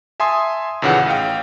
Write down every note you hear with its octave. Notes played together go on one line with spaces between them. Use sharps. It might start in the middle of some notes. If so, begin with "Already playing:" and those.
E5 G#5 A5 C6 D#6
D#2 A#2 C#3 E3 F#5
A1 F5 G5